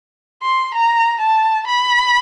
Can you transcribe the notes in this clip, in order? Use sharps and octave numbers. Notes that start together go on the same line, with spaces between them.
C6
A#5
A5
B5